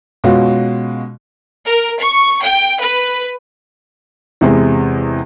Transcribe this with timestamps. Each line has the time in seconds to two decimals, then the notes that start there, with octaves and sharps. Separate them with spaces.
0.24 B2 G#3 C#4 F4 F#4
1.64 A#4
2.00 C#6
2.42 G5
2.80 B4
4.41 E2 C3 G#3 C4